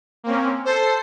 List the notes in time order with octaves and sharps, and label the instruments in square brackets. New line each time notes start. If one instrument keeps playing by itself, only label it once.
[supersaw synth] A#3 C4 C#4
[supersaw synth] A4 C7 [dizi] C5